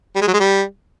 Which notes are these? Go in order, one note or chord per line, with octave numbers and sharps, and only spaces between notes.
G3
G#3
F#3
G#3
G3